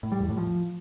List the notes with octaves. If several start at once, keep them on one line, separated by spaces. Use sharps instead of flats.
A2
G3
E2
A2
F3